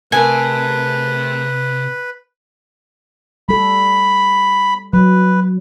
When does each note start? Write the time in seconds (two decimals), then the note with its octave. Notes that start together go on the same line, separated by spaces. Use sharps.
0.12 C3 A3 G#4 A#4 B4 G#5
3.49 G3 A4 B5
4.93 F#3 B4